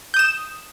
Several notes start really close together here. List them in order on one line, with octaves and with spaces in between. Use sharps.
G6 D#6 E7